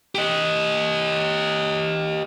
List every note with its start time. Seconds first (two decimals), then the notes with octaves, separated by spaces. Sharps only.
0.15 G4 D#5